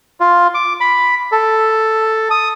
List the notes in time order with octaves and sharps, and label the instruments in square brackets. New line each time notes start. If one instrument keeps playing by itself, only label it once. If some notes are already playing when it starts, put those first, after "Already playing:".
[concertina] F4
D6
B5
A4
D#6